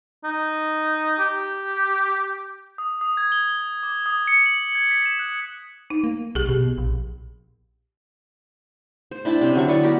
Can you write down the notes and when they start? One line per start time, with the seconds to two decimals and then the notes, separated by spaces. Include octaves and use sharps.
0.24 D#4
1.19 G4
2.78 D#6
3.01 D#6
3.17 G#6
3.32 G7
3.83 D6
4.06 D#6
4.28 C#7
4.46 F#7
4.75 G#6
4.91 B6
5.06 E7
5.19 F#6
5.90 D#4
6.04 A#3
6.35 B1 G4 G#4
6.49 B2
6.78 A#1
9.11 C5
9.25 D4 E4 G5 A5
9.41 C3 C4 C#4
9.55 D3 F#3 C#6
9.68 B3 E4 D5
9.83 F#4 G4 A#4 D5